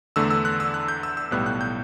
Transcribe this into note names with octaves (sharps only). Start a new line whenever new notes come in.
E2 D3 A3 E6
E6
F#6
E6
F#6
G6
E6
E6
B1 A2 G3 B3 F#6
F#6
G6